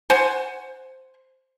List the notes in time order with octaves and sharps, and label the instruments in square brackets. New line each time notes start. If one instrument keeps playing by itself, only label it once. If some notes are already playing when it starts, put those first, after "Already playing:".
[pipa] C5 F#5 G#5